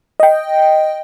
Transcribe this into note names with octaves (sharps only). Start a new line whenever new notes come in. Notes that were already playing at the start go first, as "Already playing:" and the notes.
D#5 G5